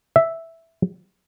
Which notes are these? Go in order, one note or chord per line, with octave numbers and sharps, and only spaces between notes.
E5